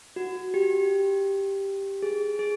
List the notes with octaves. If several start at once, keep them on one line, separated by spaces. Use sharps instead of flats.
F#4
G4
G#4
G#4